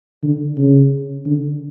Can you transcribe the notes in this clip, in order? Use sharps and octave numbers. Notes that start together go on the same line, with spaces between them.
D3
C#3
D3